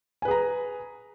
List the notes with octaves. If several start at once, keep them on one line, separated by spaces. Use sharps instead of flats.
G#4 B4 G#5 A#5